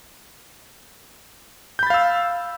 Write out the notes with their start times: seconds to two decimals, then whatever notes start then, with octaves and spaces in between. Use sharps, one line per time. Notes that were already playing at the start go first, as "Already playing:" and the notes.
1.79 G6
1.83 B5
1.87 A6
1.90 F5
1.94 E6